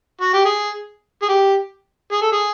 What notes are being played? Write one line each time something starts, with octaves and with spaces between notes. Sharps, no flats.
F#4
G4
G#4
G#4
G4
G#4
A4
G#4